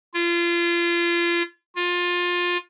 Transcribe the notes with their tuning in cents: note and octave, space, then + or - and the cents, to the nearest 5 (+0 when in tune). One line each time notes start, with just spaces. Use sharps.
F4 -30
F4 +20